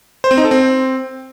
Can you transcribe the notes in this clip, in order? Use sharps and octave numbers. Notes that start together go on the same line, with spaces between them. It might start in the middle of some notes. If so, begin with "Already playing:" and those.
C5
C4
D#4
A4
C4